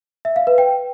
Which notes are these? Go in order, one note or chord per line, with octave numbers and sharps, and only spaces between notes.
E5
F5
B4
G5